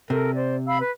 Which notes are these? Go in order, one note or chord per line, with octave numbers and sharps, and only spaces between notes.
C3 A4 A#4
C5 D5
F5 B5 E6
B4